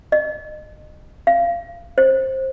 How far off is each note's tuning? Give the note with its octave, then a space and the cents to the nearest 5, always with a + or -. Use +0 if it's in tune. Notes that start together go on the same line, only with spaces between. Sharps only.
D#5 -30
F5 -20
C5 +20